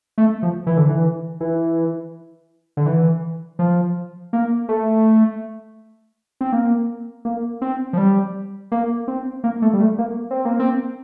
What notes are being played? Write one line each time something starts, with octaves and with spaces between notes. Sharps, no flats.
A3
F3
E3
D3
E3
E3
D3
E3
F3
A#3
A3
C4
A#3
A#3
C4
F3
G3
A#3
C4
A#3
A3
G3
A3
A#3
C4
A#3
C4